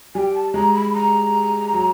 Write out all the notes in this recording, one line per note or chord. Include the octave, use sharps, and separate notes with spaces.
G3 G5 G#5
A5
G#3 A#5
B5
A#5
F#3